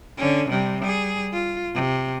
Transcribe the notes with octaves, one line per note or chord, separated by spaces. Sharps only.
D3 C#4
C3 G3
G3 G#4
F4
C3